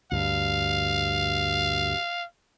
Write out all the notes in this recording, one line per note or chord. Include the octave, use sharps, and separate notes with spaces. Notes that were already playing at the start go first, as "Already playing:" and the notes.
D2 G2 F5